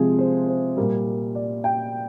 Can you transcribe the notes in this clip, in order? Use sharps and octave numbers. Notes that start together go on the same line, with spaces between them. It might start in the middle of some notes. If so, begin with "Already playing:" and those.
Already playing: C3 F3 G#3 G#4
C5
C5
A#2 G3 A#4
A#4
D5
G5